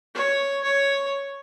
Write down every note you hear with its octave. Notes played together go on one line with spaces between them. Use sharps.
C#5
C#5